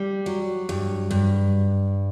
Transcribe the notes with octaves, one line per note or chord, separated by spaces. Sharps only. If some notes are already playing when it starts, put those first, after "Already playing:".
Already playing: G3
F#3
G2
G2